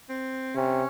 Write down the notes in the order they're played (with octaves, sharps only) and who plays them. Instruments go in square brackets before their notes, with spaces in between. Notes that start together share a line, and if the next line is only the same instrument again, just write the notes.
[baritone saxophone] C4
[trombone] C3 [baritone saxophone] C#4